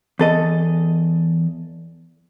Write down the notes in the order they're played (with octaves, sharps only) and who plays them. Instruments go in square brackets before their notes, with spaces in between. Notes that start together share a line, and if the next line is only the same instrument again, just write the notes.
[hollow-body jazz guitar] E2 A4 D#5